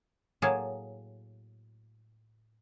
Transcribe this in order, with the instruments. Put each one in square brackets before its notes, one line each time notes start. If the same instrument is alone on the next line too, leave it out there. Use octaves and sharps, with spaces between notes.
[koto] A2 F#3 A#3 G#4 A5